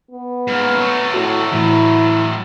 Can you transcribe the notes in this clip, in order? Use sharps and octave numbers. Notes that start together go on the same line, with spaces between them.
B3
G#2 A#3
F#3 A3
A2 F#4
A2 E3 E4